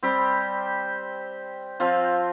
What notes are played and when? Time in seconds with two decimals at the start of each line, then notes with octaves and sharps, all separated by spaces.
0.03 G3 C4 G4 C5
1.80 F3 C4 F4